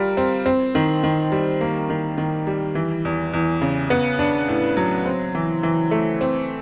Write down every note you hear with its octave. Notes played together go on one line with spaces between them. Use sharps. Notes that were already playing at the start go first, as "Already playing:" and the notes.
Already playing: G3 F4 A#4
C4
C4
D#3
D#3
G3
A#3
D#3
D#3
G3
E3
E2
E2
C#3
B3
D4
A2
F#3
C4
E3
E3
A3
C4